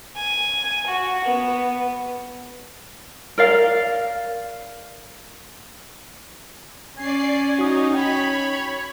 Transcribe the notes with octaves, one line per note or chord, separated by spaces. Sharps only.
G#5
F#4
B3
A#4 D5 F5
C#4 D5 G#5 C7
D#4 F#4 D#6
C#5 G5 B5